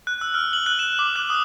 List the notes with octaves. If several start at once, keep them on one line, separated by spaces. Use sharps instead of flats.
F#6
E6
F6
F#7
F#6
E7
D6
F#6
D#6